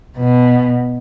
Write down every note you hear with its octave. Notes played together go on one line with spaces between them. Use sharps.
B2